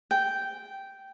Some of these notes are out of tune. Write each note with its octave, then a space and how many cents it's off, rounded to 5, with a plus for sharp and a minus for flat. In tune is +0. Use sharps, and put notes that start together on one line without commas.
G5 -10